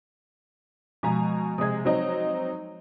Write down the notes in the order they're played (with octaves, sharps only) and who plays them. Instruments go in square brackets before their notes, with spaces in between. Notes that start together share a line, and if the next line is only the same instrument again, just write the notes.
[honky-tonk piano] B2 G#5 A#5 [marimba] F3 G#3
[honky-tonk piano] C3 G#3 [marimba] D#6 G#6
[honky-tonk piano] F#3 C4 D#4